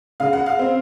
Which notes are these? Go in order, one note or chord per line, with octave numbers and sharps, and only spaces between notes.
C#3 F5
F#5
F5
C4